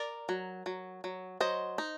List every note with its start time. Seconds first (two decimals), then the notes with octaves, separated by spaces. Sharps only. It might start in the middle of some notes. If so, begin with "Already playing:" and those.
Already playing: A#4 D5
0.29 F#3
0.66 F#3
1.04 F#3
1.40 F#3 C5 D#5
1.78 D#4